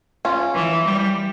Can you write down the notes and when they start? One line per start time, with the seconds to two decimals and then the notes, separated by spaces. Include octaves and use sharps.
0.25 C#4 F4
0.54 E3
0.85 G3